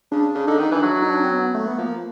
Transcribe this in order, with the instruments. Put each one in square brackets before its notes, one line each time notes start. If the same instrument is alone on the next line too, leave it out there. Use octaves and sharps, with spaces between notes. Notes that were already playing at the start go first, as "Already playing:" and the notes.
[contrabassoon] C#3 [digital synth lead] D4
[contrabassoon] C#3 [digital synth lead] D4
[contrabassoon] D3 [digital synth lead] D#4
[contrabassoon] D#3 [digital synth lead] D#4
[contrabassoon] E3 [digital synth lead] D4
[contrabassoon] F#3
[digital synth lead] D#4
D4
C#4
C4
B3
A3
B3
[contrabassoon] F3 [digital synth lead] A#3